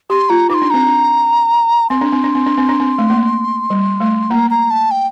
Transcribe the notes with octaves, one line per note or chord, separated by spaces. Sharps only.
G4 C6
F4 A#5
D#4 C6 D6
D4
C4 A#5
D4
C4 C6
D4
C4
D4
C4
D4
C4
D4
C4
A3
A#3
G3
A3
A#3 A#5
A#5
A5
G5